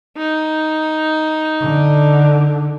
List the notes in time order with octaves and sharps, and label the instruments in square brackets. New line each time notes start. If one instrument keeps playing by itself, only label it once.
[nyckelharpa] D#4
[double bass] D3